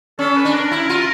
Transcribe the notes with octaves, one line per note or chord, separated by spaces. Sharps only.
C#4 A4
B4
D4
A#4
E4
F4